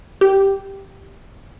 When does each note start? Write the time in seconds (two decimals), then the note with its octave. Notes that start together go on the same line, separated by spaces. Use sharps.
0.21 G4